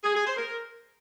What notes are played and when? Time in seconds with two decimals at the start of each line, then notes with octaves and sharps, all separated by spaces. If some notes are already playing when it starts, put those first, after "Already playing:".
0.04 G#4
0.15 G#4
0.26 C5
0.37 A#4